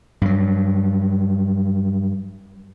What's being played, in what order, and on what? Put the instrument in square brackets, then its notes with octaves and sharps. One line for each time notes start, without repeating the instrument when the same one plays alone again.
[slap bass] G2 F#3